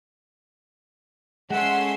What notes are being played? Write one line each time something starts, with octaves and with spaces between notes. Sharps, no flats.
G#3 A3 C#4 E5 F#5 C6